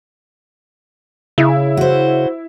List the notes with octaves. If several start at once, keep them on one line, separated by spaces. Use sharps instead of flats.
C#3 E4
F#4 C5